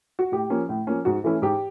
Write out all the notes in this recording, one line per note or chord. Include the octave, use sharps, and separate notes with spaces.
F#4
A2 G4
F3 A#3 C#4
A2
F3 A#3 C#4
G#2 F#4
E3 A3 C#4 E4
G#2 G4